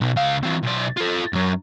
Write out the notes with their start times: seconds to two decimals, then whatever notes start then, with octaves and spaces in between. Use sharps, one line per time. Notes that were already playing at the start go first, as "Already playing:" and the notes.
0.01 B1 B2
0.16 C#2 F5
0.43 E3 C4
0.63 B1 D5
0.97 F4 A4
1.33 F#2 F#3